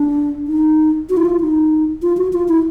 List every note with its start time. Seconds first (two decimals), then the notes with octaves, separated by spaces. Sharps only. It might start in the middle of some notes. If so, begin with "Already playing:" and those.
Already playing: D4
0.48 D#4
1.10 F#4
1.17 E4
1.25 F4
1.41 D#4
2.02 F4
2.17 F#4
2.33 F4
2.48 E4